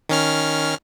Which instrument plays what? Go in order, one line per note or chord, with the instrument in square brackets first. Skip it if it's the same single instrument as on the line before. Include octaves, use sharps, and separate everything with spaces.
[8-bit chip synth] D#3 C#4 F6